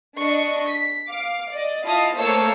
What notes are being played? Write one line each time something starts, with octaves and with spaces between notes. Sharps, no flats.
D4 D#5 C#6
B6
F5 D6
D5 D#5
E4 F4 D#5 F5 A5 D#6
A3 A#3 C5 C#5 A5 E6